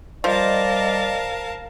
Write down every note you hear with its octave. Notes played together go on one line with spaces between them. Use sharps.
F3 G3 A#4 D5 D#5 F5 A5